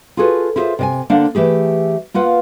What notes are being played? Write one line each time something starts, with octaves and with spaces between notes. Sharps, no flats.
F4 F#4 G#4 A4 B4
E4 F4 G#4 A4 C5 E5
C3 D5 G#5
D3 A#3 D4 C5 D5 F#5
E3 A3 G4 G#4
A#3 F4 B4 F#5